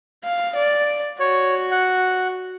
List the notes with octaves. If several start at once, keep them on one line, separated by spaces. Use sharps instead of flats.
F5
D5
F#4 C#5
F#5